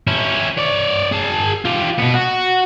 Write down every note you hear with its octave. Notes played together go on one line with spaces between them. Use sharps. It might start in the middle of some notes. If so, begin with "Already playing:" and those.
C#4 E4
C#5 D5
G#4 A5
F4 G4
B2 B3
F#4